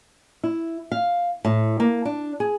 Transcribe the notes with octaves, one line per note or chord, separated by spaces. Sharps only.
E4
F5
A2
A#3
D4
G#4